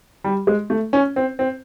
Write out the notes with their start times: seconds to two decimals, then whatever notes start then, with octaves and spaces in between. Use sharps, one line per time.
0.24 G3
0.47 G#3
0.70 A3
0.93 C#4
1.16 C4
1.39 C4